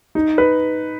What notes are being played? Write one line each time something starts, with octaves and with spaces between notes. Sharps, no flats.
D#4
B4